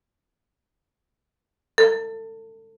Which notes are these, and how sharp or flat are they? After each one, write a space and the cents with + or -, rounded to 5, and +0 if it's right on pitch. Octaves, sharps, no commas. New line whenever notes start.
A4 +35